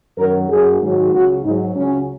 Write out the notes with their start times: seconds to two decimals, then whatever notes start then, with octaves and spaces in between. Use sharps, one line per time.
0.17 F#2 D#3 F#3 A#4
0.49 F#2 F#3 G#4
0.81 G#2 D#3 F#3
1.13 C#2 C#3 F#3 F#4
1.44 G#2 F#3 D#4
1.76 C#2 C#3 F#3 C#4